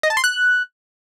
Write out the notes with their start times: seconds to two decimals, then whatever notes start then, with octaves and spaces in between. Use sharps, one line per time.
0.03 D#5
0.10 A5
0.17 C6
0.24 F#6